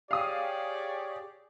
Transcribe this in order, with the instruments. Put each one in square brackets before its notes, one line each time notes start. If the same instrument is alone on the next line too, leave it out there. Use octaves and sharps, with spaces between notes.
[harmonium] G4 G#4 [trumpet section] C#5 D5 [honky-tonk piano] F5 D#6